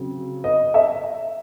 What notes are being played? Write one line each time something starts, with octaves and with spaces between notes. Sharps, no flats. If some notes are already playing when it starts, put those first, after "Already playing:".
Already playing: C#3 F#3 C4
D#5
E5